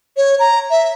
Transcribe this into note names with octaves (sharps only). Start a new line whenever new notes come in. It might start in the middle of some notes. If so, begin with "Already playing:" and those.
C#5
A#5
E5